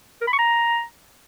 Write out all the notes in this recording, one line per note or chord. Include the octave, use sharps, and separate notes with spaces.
A#4
B5
C#6
A#5